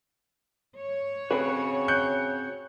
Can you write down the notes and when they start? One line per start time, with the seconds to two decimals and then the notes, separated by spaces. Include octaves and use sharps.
0.78 C#5
1.31 C#3 C4 F#4 B4
1.88 F#6 G6 C#7